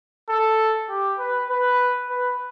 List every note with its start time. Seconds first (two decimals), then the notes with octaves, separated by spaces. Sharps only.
0.29 A4
0.89 G4
1.19 B4
1.50 B4
2.09 B4